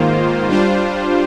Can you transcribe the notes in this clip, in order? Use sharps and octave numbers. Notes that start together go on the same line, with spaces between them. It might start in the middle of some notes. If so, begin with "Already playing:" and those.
Already playing: G#2 D#3 A#3 F4 C5
G3 D4 F4 C5